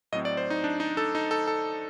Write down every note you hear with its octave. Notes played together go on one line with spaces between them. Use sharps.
A2 F#3 C4 D#5
D5
C5
D#4
D4
D#4
A4
D#4
A4
A4